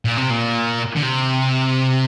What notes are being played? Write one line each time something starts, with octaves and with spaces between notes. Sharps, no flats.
A#2
C3
A#2
D3
C3